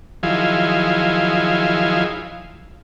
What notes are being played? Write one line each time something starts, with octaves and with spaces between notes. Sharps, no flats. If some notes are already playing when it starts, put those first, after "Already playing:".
D#3 F3 F#3 E4 F4 G#4